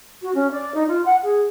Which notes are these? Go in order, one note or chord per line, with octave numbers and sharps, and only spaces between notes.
F#4
C#4
D5
D#4
F4
F#5
G#4